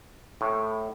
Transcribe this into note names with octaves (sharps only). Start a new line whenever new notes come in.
A2